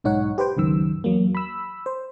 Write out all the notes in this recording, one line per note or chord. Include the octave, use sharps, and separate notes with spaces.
B1 G#2 D#4 C#5 F#5
G4 B4 C5 G5
C#2 F#2 D#3 E6
E2 F#3 A#3
B5 E6
C5